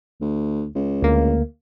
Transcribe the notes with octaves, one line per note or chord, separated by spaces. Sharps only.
D2
C#2
D2 A#3